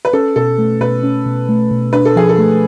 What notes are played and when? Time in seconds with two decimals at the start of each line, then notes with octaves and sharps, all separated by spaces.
0.05 B4
0.13 C#4 A4
0.36 B2 A4
0.59 A3
0.81 B2 B4
1.03 C#4
1.26 B2
1.49 A3
1.71 B2
1.93 D4 B4
2.05 A4
2.16 F3 G#4
2.29 A4
2.38 A3